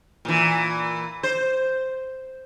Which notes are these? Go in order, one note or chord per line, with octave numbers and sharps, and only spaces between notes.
A#2 E3
C5